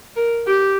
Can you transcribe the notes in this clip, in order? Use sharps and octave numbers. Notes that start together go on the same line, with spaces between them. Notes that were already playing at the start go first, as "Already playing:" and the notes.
A#4
G4